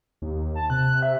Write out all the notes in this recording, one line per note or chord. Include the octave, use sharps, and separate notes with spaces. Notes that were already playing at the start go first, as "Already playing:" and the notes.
D#2
A5
C3 F#6
E5